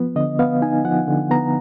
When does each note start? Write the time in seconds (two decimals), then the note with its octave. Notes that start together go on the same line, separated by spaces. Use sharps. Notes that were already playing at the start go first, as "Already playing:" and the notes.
Already playing: F3 B3
0.16 D3 D#5
0.39 B3 F5
0.62 D#4 G#5
0.85 F3 F#5
1.08 D3
1.31 B3 A#5